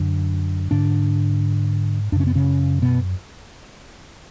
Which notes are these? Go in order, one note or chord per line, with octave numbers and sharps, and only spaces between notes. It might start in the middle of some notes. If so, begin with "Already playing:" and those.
Already playing: F#2 D3
G#2 D3 D4
F#2 C#3 C#4 D4
B3
C#3 C#4
B2 B3